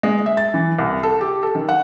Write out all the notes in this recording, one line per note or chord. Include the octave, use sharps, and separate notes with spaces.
G#3
E5
A6
E3
C2
A4
G4
A4
D#3
F#5